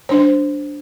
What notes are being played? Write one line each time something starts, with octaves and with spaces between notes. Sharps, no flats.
G3 D4 C5